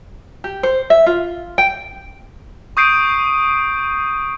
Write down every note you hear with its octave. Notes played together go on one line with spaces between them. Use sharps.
G4
C5
E5
F4
G5
C#6 D#6 G6 C7 D7 D#7